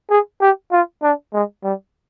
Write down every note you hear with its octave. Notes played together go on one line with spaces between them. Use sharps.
G#4
G4
F4
D4
G#3
G3